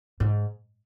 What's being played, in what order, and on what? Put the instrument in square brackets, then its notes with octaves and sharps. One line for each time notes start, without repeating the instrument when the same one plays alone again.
[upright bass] G#2